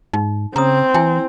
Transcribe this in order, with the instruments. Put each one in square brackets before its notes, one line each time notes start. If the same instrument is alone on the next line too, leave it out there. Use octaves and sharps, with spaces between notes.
[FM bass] G#2 [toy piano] D#4
[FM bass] C#3 [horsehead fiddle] C4 [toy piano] A#5 D#6
[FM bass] E3 [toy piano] E4 G5 G#5